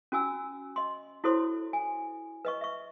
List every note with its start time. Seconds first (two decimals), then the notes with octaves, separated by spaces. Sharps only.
0.12 C#4 F#4 G#5 E6
0.76 D#5 C6
1.24 E4 F#4 A4 C5 C#5 C6
1.73 G#5
2.45 B4 D#5 C#6
2.61 E5 C#6